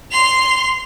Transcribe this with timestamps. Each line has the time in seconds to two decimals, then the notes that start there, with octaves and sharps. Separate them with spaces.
0.12 C6 F7